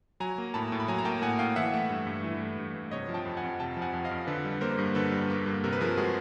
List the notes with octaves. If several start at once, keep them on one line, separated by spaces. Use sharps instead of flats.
F#3 G#5 A#5
A#3
A2 A5 B5
A2
B5
F#3 G#5 A#5
A#5
A#3 G5 A5
A2 F#5 G#5
A2 F5 G5
E3 E5 F#5
A3
G2
G2
E3
A3
G2
G2
C3 C#5 D#5
F3
G5 A5
F2
F#5 G#5
F2
C3 G5 A5
F3
F#5 G#5
F2
D#5 F5
F2
D3 A4 B4
G3
A#3 A#4 C5
G2
D3 A4 B4
G3
A#3
G2
C3 A#4
B4
F3 G#4 A#4
G#3 F#4 G#4